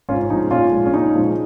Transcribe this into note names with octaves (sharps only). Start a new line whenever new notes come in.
G#2 C#4 F4
F3 G#3 D#4
A#2 C#4 F4
F3 G#3
C#4
A#2 D#4
F3 G#3